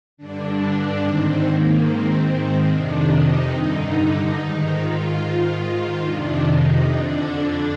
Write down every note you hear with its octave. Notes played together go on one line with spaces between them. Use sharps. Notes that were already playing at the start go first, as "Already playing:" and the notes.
G2 D3 D4
G#2 D#3 C4
A#3
G#2 D#3 C4
C4
F2 C3 D#3 D4
D#4
G2 D3 D#4
G#2 D#3
F4
G#2 D#3
F4
F2 C3 D#3 D4
D#4
F2 D3 D4